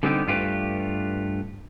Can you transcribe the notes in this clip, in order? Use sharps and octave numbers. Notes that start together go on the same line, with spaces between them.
D3 G3 B3 C4 D#4 G4
G2 A3 F4 G4 B4